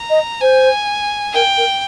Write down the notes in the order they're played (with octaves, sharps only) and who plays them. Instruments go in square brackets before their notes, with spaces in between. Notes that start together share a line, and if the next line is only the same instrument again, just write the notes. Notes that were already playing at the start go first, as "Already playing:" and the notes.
Already playing: [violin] A#5
[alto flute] D#5
[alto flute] C5 [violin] G#5
[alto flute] A#4 [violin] G5
[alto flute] A#4